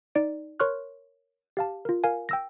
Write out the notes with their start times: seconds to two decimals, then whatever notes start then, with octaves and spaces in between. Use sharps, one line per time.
0.15 D#4 D5 D7
0.60 A#4 C#5 C6 C#6 F6 F#6
1.57 G4 F5 A5
1.85 F4 A#4
2.04 A#4 F5 G#5
2.29 G5 E6 A#6